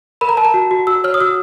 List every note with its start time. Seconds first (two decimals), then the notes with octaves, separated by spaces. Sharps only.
0.21 A#4 B5
0.29 A#5
0.37 A#4 A5
0.45 A#5
0.54 F#4
0.71 F#4
0.87 F#4 E6
1.04 C#5 F6
1.14 D#6
1.20 F#4 E6